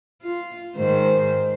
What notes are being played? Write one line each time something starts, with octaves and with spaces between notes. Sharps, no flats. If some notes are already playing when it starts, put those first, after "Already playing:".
F4
G#2 D#3 C5